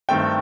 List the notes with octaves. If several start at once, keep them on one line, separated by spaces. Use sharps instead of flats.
G2 D#3 A3 C4 G5